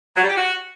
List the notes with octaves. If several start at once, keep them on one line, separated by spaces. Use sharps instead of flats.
F#3
G3
G4
F#4